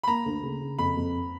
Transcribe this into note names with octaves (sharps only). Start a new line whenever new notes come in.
B5
A#3 A#5
D2
C#3
C#3
F2 B5
F2